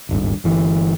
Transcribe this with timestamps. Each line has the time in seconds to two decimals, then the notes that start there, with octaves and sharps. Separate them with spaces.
0.09 D#1 G#1 G2
0.44 G1 E3